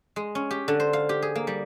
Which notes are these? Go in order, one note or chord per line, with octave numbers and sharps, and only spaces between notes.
G#3
C#4
G4
D3
C5
F5
G4
G#4
A#3
G3